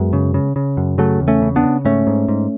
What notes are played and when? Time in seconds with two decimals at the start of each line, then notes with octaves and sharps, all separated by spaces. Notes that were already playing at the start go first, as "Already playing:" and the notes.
Already playing: F#2 G#3 B3
0.13 C#3
0.34 C#3
0.56 C#3
0.77 F#2
0.98 C#3 F#3 A3
1.21 E2
1.28 A3 C#4
1.42 C#3
1.56 B3 D4
1.64 C#3
1.85 G#2 A3 C#4
2.07 G#2
2.29 G#2